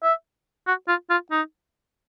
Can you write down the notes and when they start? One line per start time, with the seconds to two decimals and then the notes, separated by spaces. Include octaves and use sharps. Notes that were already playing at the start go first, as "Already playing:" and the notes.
0.03 E5
0.67 F#4
0.88 F4
1.10 F4
1.31 D#4